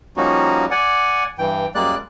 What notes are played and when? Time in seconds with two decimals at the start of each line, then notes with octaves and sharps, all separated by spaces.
0.17 F3 G3 A#3 C#4 D#4 F#4
0.71 D5 F#5 G#5
1.39 G2 E3 G5
1.75 F#2 G3 G#3 A#3 D5 F#6